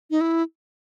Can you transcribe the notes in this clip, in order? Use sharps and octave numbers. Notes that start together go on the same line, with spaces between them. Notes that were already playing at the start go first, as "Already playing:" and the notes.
D#4
E4